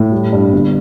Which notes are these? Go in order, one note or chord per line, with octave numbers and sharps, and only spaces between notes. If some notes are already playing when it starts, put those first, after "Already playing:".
Already playing: A2
G3
G2
G1